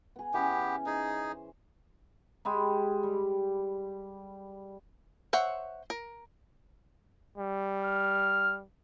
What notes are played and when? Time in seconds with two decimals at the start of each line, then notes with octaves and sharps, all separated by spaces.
0.16 B3 G#4
0.34 E3 B3 C#4 G4
0.86 D#4 G#4 C5
2.45 G#3 G4 B5
3.03 G3
5.33 C5 C#5 E5 F#5
5.90 A#4
7.38 G3
7.84 F6